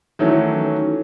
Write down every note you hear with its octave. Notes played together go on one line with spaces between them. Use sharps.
D#3 E3 F#3 A3 C#4